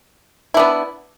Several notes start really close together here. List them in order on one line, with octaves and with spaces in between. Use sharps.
E4 D4 B3